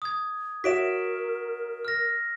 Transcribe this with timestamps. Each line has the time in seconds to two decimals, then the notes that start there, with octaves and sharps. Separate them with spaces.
0.02 D#6 G#6
0.64 F#4 A#4 C#5 E5 B6 D7 E7
1.85 F6 A#6